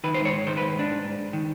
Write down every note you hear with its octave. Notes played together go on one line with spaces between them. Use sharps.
D#3 B4
C5
G#2
C#5
G#2
D#3 C5
B4
G#2
G#2 D4
G#2
G#2
G#2
D#3